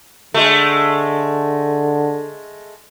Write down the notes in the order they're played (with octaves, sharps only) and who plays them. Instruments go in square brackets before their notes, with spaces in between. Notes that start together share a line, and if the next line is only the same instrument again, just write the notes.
[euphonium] D3 [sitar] G#3 A3